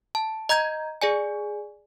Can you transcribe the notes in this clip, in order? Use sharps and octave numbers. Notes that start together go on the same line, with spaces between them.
A5
D#5 A#5 G6 G#6
G#4 D5 G#5